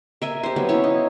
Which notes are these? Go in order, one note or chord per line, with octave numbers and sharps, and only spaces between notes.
A#4 E5 G#5
G4 C5
F#3 B3
C#4 E4 C#5
D#4